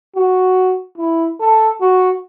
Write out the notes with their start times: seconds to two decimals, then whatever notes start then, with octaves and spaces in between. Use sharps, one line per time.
0.16 F#4
0.98 E4
1.40 A4
1.81 F#4